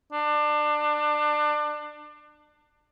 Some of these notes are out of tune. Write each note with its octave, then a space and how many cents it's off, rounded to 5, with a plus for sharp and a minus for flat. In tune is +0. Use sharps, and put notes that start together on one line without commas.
D4 +25